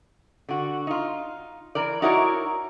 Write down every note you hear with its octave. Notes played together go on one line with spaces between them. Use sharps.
D3 F#4
D#4 F4
E3 A#4 D5
D#4 E4 F#4 A#4 C#5 D5